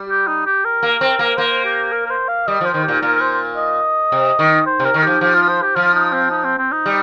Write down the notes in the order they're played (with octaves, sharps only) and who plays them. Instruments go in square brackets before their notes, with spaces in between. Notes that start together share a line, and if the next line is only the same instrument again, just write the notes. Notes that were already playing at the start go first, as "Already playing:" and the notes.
Already playing: [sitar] G3
[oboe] G4
D#4
G4
A#4
[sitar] A#3
C4
A#3
[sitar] A#3 [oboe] C5
[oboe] G4
A#4
A#4
C5
F5
[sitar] G3 [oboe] D#5
[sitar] F3
[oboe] C5
[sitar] D#3
[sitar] A#2 [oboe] G4
[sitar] A#2 [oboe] A#4
[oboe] C5
D#5
[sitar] C3
D#3
[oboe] C5
[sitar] C3
[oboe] A#4
[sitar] D#3
[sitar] F3 [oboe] G4
[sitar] F3 [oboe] G4
[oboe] F4
C5
G4
[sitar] F3 [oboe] F4
[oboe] D#4
C4
D#4
C4
C4
D#4
[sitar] G3